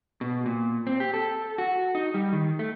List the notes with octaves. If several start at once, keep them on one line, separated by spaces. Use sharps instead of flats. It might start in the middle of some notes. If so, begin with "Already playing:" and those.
B2
A#2
C4
G4
A4
F#4
D#4
G3
D#3
A3